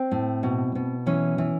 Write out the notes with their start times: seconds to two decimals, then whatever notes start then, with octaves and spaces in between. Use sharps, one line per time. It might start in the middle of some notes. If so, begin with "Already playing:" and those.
Already playing: C4
0.12 A2
0.43 B2
0.75 B2
1.06 E3 C#4
1.38 E3